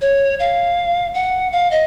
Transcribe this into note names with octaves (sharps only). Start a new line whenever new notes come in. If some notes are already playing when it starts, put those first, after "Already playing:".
C#5
F5
F#5
F5
D#5